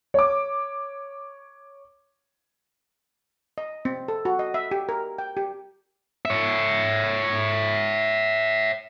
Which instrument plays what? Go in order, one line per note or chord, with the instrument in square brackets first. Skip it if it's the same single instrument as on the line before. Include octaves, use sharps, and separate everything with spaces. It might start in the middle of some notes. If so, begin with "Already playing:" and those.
[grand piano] C#5 D6
[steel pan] D#5
C4
A4
F#4
D#5
E5
G4
A#4
G5
G4
[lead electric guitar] C#5 E5